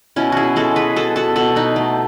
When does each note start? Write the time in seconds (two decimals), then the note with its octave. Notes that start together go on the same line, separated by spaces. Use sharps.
0.16 B2 C#4 E4
0.32 E4 F#4 G#4
0.56 G#3 F#4 A4
0.76 G#4 B4
0.96 B3 F#4 A4
1.16 F#4 A4
1.36 B2 F#4 A4
1.56 B3 D#4
1.76 A3